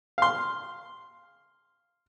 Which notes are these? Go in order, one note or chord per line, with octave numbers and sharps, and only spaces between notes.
F5 C6